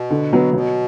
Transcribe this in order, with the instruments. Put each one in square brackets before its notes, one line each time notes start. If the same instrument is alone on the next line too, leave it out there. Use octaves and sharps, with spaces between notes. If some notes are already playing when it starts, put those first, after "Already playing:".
Already playing: [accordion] B2
[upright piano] D3
F#3 B3
[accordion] B2 [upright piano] F#3